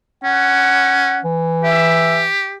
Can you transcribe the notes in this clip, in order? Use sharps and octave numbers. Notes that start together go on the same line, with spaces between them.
C#4 F#5
E3
G4 E5